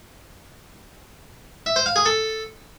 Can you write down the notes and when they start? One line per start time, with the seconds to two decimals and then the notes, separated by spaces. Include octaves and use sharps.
1.66 E5
1.76 C5
1.86 F5
1.96 G#4
2.06 A4